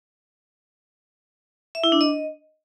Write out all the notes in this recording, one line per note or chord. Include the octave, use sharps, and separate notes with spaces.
E5
E4
D4
D#5